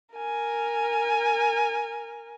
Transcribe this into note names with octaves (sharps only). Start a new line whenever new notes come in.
A#4 G#5